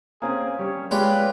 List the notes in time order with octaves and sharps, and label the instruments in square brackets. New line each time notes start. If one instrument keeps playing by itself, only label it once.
[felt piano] A#3 C4 C#4 [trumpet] G#4
[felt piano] G3 C#4 [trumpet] C#5
[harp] G#3 [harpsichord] F4 G4 D5 [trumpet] B4 [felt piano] C#5